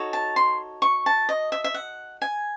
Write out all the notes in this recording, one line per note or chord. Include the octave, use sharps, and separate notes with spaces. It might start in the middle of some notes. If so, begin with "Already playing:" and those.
Already playing: D#4 F#4 A4 C#5
A5
C6
C#6
A5
D#5
E5
E5
F#5
G#5